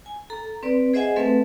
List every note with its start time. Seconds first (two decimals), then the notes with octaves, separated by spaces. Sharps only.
0.06 G#5
0.30 A4 A#5
0.63 C4 B4 D5
0.93 G#4 C5 D#5 E5 F#5 G#5
1.16 A3 C4 A4 B4 E5